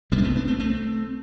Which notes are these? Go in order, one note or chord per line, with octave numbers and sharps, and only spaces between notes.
C2 C3 G3 B3
D4
A3 C4
B3 D4
A3 C4
A3 C4